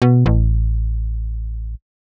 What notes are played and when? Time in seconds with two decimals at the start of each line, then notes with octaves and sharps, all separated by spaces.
0.02 B2
0.26 A1